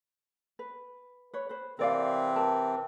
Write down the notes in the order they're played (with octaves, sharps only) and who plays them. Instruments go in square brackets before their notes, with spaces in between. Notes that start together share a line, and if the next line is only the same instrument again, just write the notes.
[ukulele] B4
B4 C#5
B4 C5
[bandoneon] C3 E3 C4 [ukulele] A#4 D5 F5
[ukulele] A#4 A5